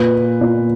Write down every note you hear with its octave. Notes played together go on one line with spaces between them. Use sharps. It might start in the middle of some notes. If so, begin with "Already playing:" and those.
Already playing: A#2 B4
A#2